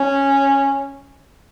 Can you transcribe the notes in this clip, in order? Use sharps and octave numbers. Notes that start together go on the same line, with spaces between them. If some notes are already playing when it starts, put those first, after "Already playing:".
Already playing: C#4